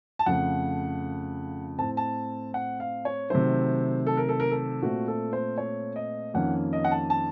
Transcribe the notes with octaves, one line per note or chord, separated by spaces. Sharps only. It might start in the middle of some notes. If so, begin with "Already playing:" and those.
A5
F2 C#3 F3 A3 F#5
A2 A3 C4 A5
A5
F#5
F5
C#5
C3 D#3 F#3 A3 C5
A4
A#4
A4
A#4
A4
A#2 A3 C4 F#4
A4
C5
C#5
D#5
F2 D#3 A#3 C#4 F#5
D#5
F#5
A5
A5